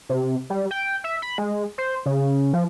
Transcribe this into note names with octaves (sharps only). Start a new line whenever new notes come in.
C3
G3
G5
E5
B5
G#3
C5
C#3
F3